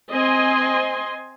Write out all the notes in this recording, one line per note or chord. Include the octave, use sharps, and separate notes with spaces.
C4 D#5 G#5 C6